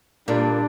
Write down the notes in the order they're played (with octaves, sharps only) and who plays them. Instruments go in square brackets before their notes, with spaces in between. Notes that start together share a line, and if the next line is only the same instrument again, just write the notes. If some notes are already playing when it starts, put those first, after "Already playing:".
[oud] A#2 [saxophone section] D3 G3 D4